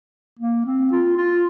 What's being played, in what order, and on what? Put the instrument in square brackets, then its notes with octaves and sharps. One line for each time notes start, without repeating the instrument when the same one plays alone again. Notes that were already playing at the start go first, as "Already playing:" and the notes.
[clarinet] A#3
C4
F4
F4